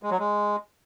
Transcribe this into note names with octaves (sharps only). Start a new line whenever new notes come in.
G#3
F#3
G#3